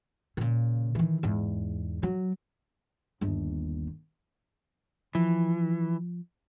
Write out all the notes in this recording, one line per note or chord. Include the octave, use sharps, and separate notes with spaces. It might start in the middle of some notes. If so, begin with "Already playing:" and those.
A#2 C#3
D#3 E3
E2 G#2
F#3
G1 D#2
E3 F3